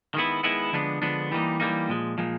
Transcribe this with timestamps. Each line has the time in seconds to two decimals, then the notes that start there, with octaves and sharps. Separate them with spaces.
0.14 D#3 G#3 B3 E4
0.43 D#3 G#3 B3 E4
0.73 D3 F3 G#3 B3 D4
1.02 D3 F3 G#3 B3 D4
1.32 E3 G3 A#3 D#4
1.60 E3 G3 A#3 D#4
1.89 A#2 F3 G#3
2.18 A#2 F3 G#3